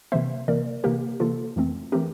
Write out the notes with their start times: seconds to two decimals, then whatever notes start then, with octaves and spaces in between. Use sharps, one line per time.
0.12 C3 E3 A#3 C5 E5
0.48 C3 E3 A#3 A#4 D5
0.84 C3 E3 A#3 G4 A#4
1.20 C3 E3 A#3 F4 A4
1.56 F2 E3 A3 C4
1.92 E3 A3 C4 G4 A#4